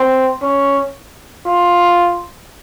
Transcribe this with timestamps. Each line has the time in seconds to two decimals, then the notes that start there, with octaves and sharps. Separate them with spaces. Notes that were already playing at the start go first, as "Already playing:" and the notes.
Already playing: C4
0.42 C#4
1.46 F4